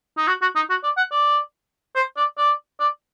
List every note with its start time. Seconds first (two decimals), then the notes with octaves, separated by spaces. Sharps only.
0.17 D#4
0.28 F#4
0.42 F#4
0.56 D#4
0.70 F#4
0.84 D5
0.97 F#5
1.12 D5
1.95 C5
2.17 D5
2.38 D5
2.80 D5